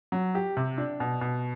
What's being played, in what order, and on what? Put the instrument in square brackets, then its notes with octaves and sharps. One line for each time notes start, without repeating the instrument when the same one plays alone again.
[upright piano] F#3
G4
C3
D4
B2
B2